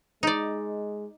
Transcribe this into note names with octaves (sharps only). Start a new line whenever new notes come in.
G#3 D#4 D5